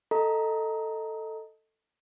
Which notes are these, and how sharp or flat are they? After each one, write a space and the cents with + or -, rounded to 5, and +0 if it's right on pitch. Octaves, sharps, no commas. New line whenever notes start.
A4 +10 D#5 +0 A#5 +0